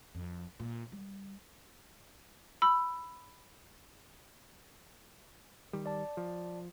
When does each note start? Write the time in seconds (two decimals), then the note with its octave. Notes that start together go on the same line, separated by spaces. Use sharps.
0.15 F2
0.60 A#2
0.92 G3
2.62 B5 E6
5.73 D#3 G3
5.86 D5 A5
6.17 F3